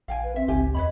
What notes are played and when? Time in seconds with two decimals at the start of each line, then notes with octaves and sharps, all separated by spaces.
0.08 A#1 F5 G5 G#5
0.24 B4
0.36 C4 E5
0.48 G#1 C#2 G4 G#5
0.75 E2 B4 C#5 D#5 B5